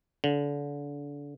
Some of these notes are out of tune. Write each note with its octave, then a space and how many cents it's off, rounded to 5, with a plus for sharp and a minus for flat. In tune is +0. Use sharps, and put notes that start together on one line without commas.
D3 -30